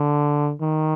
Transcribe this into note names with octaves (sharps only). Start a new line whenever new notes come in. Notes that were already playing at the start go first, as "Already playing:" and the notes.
Already playing: D3
D#3